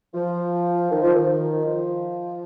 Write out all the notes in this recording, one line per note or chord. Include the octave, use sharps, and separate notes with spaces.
F3
D#3
F3
D#3
F3